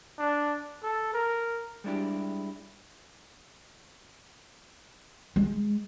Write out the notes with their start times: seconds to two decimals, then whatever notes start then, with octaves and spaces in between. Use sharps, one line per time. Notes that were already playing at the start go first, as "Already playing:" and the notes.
0.19 D4
0.83 A4
1.14 A#4
1.84 G3 G#3 D4 E4 G4
5.36 G#3